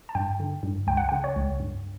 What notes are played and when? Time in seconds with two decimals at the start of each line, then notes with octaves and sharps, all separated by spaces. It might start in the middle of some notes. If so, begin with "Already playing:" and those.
0.09 A5
0.15 G2 G5
0.40 D3
0.63 G2
0.87 C#2 G5
0.97 F#5
1.09 G5
1.12 C#3
1.24 C#5
1.36 C#2
1.60 G2